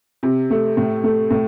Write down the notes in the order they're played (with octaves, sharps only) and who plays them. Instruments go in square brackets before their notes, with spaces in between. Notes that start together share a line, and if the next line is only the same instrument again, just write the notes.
[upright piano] C3
A3
A2
A3
A2